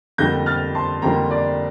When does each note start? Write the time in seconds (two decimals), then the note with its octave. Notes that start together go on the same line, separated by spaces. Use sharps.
0.18 F2 D3 G3 A#3 G6 A#6
0.46 F6 A6
0.75 A5 C6
1.02 F2 D3 G3 A#3 G5 A#5
1.31 D5